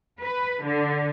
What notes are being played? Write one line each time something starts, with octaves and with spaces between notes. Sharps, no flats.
B4
D3